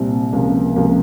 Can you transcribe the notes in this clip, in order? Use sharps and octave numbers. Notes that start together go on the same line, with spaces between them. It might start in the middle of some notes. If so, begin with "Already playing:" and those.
Already playing: C2 A#2 G3 C4
C#2 C3 F3 A#3
C#2 C3 F3 A#3